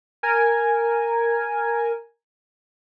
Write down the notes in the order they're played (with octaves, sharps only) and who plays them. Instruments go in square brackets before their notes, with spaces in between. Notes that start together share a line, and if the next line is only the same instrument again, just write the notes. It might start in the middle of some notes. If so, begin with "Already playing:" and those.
[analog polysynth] A#4 G#5